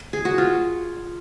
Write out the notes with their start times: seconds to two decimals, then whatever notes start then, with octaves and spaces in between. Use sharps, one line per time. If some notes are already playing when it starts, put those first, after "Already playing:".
Already playing: A#4
0.13 G#4
0.25 F#4
0.38 F4